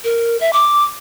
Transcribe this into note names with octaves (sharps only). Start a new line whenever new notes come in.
A#4
E5
D6